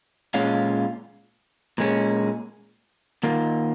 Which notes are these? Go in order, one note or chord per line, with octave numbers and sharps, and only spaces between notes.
A#2 G#3 C#4 F4
A#2 G#3 C#4
D#3 A#3 F4